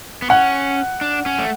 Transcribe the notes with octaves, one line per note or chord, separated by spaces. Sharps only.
B3
C#4 F#5
D4
C#4
A3